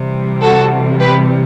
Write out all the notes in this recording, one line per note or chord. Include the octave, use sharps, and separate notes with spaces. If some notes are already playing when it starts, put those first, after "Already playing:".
Already playing: C3 E3 G3
F#4 A4
G4 B4